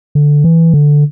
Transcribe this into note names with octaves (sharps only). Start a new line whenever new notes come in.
D3
E3
D3